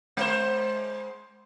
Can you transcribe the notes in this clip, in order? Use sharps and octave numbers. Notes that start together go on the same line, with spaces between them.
G#3 C5